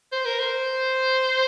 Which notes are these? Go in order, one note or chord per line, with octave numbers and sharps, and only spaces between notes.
C5
A#4
C5